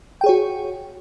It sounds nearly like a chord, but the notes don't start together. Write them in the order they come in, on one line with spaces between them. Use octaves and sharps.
G5 G#4 C#5 F#4